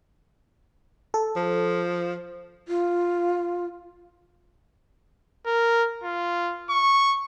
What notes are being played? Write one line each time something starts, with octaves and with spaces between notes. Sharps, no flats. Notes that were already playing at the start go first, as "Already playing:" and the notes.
A4
F3
F4
A#4
F4
C#6